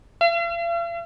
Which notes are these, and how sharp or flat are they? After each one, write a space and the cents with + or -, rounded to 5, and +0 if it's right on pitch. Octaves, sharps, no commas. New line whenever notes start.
F5 -45